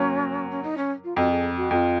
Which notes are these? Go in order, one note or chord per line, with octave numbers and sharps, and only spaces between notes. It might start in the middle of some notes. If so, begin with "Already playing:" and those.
Already playing: F#3 A#3 C#4
C#4
D#4
C#4
F4
F2 F#4
G#4
F#4
F2 F4 F#4